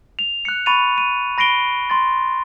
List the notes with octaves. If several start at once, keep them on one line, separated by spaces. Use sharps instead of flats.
F7
F#6 C#7
B5 C#6 A6 D#7 F7
D#7
B5 A#6 C7 D7 G7
C6 A6